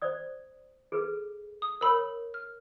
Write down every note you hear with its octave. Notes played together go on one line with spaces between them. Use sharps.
C5 D5 D#6
G#4 A4 B4
D#6
A#4 C#5 B5 E6
F6